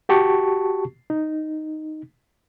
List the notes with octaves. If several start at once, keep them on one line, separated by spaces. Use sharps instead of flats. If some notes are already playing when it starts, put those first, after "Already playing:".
F#4 G4 A5 C#6
D#4